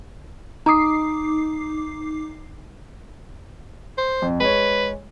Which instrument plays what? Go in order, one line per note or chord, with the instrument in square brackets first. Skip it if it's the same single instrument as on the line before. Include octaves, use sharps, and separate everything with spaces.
[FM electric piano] D#4 D6 C7 [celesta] A#5 D#6
[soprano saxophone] C5
[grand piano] F2
[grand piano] G#3 C#5 [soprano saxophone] B4